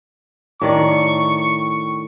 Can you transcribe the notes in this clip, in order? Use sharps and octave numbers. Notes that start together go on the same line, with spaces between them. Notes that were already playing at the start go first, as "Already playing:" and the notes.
A2 D#3 D5 C#6